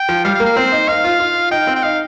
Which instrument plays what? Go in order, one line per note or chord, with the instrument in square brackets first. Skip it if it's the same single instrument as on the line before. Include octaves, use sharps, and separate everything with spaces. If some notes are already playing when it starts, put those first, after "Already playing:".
Already playing: [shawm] G5
[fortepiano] F3
[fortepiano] G3 [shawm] F5
[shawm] F5
[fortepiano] A#3
[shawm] F5
[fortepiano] C4 [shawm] C5
[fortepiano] D#4
[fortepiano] D#4 [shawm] F5
[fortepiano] F4
F4
[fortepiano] D#4 [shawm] G5
[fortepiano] C4
[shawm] G5
[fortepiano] D#4 [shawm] F5